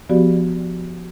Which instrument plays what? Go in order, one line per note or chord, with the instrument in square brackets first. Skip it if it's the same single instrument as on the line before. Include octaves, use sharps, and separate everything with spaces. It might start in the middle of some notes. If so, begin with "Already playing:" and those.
[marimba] F3 B3 F#4 G4 D5